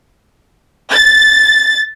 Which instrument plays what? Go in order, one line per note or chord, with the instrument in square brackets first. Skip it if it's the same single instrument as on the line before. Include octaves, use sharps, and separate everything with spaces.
[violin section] A6